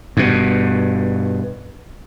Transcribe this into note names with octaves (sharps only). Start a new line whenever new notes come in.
G2 B2